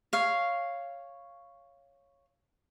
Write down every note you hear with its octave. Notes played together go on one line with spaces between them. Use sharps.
C#5 F5